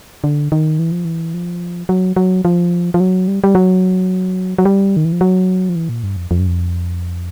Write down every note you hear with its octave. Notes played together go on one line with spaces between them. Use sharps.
D3
D#3
E3
F3
E3
F3
F#3
F#3
F3
F3
F#3
G3
G3
F#3
F#3
G3
D#3
E3
F3
F#3
F3
E3
A#2
G2
F2
F2
F#2
F2